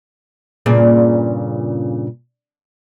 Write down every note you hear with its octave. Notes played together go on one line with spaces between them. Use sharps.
G2 A#2 C#3